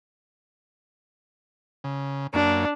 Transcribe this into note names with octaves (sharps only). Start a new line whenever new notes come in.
C#3
F#2 A#3 D4